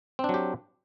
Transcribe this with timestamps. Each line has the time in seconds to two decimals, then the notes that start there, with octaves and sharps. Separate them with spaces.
0.19 C4
0.24 D4
0.29 F#3
0.34 G4